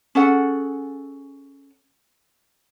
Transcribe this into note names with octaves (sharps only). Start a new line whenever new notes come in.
C#4 G#4 A4 F#5